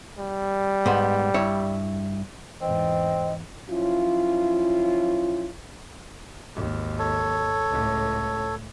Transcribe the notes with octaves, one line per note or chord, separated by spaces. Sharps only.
G3
G#2 B3
G2 E4 C#5
E2 G#2 C4 D#5
F3 F#3 C#4 E4 F4
G#1 D#2
A4 C#5
C#2 A2